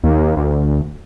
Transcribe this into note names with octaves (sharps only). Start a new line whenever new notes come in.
D#2
D2